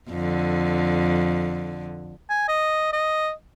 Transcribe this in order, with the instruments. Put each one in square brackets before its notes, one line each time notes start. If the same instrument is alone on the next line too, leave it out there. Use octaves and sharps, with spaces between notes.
[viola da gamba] F2 D3
[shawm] G#5
D#5
D#5